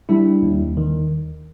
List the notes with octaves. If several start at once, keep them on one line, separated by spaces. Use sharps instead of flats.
G3 D4 E4
D#2
D#3